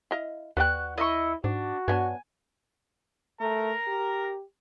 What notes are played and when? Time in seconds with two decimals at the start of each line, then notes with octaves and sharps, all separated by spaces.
0.11 E4 D#5 F5
0.57 D#2 F#4 B4 D5 G5 F#6
0.98 E4 D#5 E5 C#6
1.44 G#2 D4 F#4
1.88 G2 F#3 B3 D4 G#5
3.41 A3 A#4 A#5
3.88 G4